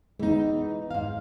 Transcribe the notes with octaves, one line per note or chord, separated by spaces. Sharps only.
E3 G#3 B3 D#4
G#2 F5